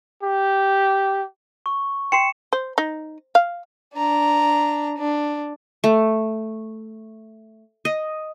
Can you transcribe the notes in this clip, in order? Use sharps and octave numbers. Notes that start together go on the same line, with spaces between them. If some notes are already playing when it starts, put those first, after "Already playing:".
G4
C#6
G5 C6 C7 C#7 E7
C5
D#4
F5
D4 A#5
D4
A3
D#5